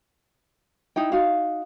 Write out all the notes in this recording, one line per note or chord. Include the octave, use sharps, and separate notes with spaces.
D#4 E4 G5
D#4 F#4 F5